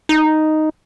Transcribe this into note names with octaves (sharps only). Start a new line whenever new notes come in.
D#4